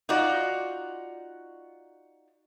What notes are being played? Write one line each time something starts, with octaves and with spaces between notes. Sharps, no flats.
D#4 F4 F#4 D5